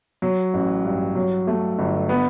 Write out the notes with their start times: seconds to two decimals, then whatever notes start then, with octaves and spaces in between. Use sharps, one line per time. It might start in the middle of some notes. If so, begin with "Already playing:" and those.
0.22 F#3
0.54 A1
0.85 G2
1.16 F#3
1.47 A3
1.78 G1
2.09 B3